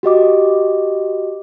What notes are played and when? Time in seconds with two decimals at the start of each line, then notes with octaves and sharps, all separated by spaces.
0.03 F#4 G4 D#5 D6